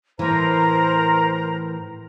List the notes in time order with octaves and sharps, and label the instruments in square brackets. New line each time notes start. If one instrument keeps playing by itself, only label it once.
[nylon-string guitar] A2 E3 [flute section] A#4 C5 A#5